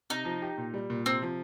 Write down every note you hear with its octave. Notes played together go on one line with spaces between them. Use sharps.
C3 D#4
F3
G4
A#2
G3
A#2
C3 C4
F3